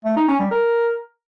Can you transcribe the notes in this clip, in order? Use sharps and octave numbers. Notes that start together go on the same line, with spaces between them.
A3
D#4
C#4
G3
A#4